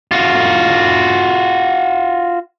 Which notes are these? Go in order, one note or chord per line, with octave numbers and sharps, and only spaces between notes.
F4 F#4